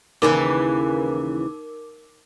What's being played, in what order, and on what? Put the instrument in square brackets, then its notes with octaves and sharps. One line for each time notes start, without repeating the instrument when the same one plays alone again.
[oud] D#2 C#3 E3 [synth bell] D#4 A#4 D6